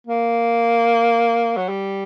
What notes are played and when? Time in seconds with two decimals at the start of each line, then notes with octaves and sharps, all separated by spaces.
0.07 A#3
1.57 F#3
1.69 G3